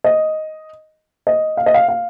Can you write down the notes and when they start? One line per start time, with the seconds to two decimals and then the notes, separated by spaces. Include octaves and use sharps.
0.04 D#5
1.27 D#5
1.57 F5
1.66 D#5
1.74 F5
1.88 F5